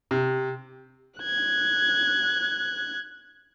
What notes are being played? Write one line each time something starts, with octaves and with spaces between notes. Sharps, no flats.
C3
F#6 G#6